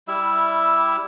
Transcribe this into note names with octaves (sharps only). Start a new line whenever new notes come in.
G3 E4 E5